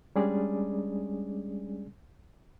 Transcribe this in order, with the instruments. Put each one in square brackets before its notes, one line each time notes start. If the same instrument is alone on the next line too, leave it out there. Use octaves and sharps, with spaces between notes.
[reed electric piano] G3 G#3 C#4 D4 G#4 D5